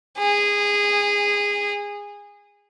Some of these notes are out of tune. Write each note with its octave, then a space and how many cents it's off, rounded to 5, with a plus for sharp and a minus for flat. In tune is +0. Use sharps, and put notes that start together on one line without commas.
G#4 -20